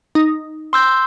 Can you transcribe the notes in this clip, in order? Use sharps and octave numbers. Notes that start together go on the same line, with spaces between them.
D#4
C6 E6 G6